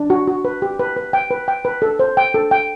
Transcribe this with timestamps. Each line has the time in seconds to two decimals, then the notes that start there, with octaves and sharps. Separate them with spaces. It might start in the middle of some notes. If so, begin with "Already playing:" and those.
Already playing: D4
0.10 F#4
0.27 F#4
0.45 B4
0.62 G4
0.79 B4
0.96 B4
1.13 G5
1.31 B4
1.48 G5
1.65 B4
1.82 A4
1.99 C5
2.17 G5
2.34 A4
2.51 G5